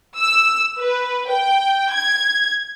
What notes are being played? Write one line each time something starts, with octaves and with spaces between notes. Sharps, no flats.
E6
B4
G5
G#6